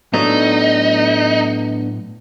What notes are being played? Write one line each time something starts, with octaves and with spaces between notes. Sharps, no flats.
A2 F#3 A3 B3 D4 D#4